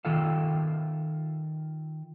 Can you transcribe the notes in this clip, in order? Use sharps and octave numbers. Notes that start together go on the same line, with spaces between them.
D#3 F4 A4 F5